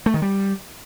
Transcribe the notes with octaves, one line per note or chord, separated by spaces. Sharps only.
A3
D#3
G3